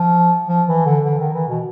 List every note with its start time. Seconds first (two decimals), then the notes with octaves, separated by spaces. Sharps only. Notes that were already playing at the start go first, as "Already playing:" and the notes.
Already playing: F3
0.49 F3
0.68 E3
0.86 D3
1.05 D3
1.19 D#3
1.33 E3
1.48 B2